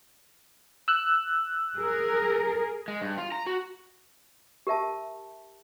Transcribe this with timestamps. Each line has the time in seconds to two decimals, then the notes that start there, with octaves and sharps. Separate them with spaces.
0.88 E6 F#6
1.77 G#4 A#4
2.88 G#3
3.02 G2
3.18 F4
3.32 A#5
3.46 F#4
4.67 G4 A#4 E5 A5